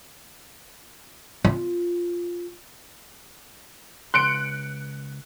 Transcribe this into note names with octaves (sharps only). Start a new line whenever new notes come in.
F4
C#2 C6 F#6 C#7 D7